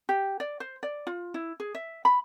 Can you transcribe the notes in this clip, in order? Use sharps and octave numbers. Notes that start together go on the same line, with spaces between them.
G4
D5
C5
D5
F4
E4
G#4
E5
B5